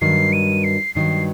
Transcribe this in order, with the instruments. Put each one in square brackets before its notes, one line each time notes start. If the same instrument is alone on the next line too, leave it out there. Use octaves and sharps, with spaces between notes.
[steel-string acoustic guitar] G2 D#3 F#3 [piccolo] C7
[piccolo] D#7
C7
[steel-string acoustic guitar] G2 D#3 F#3 [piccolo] C7